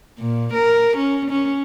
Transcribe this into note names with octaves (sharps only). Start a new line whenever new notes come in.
A#2
A#4
C#4
C#4